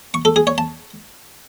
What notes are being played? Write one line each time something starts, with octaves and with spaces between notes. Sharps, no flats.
C#6
A4
G#4
C#5
A5